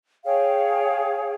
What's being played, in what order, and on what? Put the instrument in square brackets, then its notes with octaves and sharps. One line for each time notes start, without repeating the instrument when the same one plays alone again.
[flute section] G#4 C#5 F5 G5